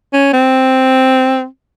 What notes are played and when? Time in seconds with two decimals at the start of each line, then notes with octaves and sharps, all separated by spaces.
0.13 C#4
0.33 C4